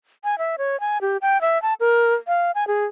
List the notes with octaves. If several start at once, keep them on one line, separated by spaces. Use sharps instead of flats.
G#5
E5
C#5
G#5
G4
G5
E5
A5
A#4
F5
G#5
G#4